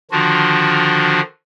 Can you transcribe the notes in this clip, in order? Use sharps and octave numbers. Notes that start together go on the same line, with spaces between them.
D3 D#3 F3 D4 F4 F#4